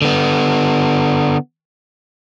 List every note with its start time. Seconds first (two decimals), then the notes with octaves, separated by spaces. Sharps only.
0.02 D3 B3